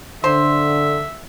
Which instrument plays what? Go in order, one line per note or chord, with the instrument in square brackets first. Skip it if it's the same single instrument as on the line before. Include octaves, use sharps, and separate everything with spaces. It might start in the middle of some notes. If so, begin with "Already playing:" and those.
[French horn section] D3 [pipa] C5 [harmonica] E5